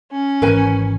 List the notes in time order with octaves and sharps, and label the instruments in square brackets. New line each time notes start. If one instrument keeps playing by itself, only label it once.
[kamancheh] C#4
[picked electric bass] G#1 E3 [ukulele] A#4 B4 G#5